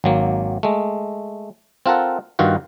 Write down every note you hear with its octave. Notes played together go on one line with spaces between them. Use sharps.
G#1 F#3 A#3
G#3 A3
C4 F4 A4 A#4 F#5
G2 D#3 F4 F#4